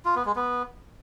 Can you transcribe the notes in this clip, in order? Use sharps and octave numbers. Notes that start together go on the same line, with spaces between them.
F4
B3
G#3
B3